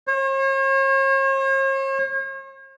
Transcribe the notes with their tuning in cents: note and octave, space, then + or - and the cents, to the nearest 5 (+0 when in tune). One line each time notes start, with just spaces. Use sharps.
C#5 -45